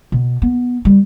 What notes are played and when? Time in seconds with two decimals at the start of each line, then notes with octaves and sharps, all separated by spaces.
0.12 B2
0.42 B3
0.85 G3